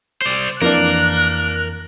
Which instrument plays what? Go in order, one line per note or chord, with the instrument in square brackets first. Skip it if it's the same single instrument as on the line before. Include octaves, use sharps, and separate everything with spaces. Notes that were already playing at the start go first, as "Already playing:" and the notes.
[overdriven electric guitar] C5 D5
[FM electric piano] F2 E3 [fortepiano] A#3 D4 [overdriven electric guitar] A#4 [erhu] F#6